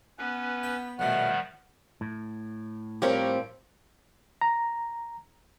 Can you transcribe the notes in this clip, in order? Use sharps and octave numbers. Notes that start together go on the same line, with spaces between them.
B3 C#4 B4
G5
A#1 B2 D#3 F3 G3 A3 F#5
A2
F3 G3 C4 G4 A#4 C#5
A#5